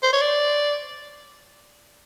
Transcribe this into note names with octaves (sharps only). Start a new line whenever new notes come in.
C5
C#5
D5